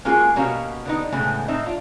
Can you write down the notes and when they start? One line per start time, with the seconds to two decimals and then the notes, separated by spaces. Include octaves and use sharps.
0.05 G#3 A#3 C#4 F4 F#4 G#4
0.36 B2 A#3 C#4 F#4 G4 F5
0.85 D3 B3 D#4
1.12 A2 C#3 E3 G#3 A3 B3
1.48 A2 C4 D#4 E5
1.66 D4 F4